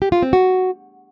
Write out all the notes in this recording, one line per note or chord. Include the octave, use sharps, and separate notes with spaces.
G4
F4
C4
F#4